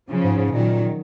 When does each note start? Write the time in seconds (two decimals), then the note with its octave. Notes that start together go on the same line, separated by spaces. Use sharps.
0.10 C#3 F3
0.24 G#2
0.38 G#2
0.52 A#2 D#3 F#3